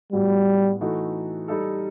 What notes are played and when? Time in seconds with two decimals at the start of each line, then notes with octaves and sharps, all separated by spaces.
0.12 A2 F#3 G3 B3 F#4
0.81 E3 A3 D#4 F#4 A4
1.48 G3 D#4 A4